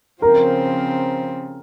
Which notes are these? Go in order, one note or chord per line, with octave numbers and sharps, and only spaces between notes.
C#3 F3 C4 A#4